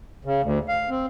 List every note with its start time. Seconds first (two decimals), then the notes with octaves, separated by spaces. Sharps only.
0.25 C#3
0.42 D2
0.68 F5
0.90 C4